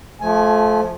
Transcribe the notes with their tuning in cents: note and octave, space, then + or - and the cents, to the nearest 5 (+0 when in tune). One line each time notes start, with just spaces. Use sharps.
F3 +5 A3 -25 G#5 +10